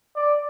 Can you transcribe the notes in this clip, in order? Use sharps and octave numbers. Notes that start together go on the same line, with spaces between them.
D5